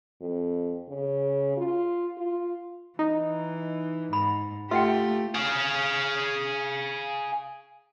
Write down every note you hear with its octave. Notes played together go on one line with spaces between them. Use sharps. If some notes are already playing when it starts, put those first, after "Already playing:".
F2
C#3
F4
F4
E3 D#4
G#2 B5
A3 F4 G4 E5 F#5 G5
G#4 F5